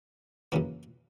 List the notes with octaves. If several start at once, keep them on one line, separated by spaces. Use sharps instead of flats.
F#2 C#3 E3 A#3